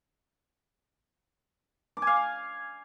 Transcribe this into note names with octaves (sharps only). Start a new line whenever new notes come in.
D6
G#5
F5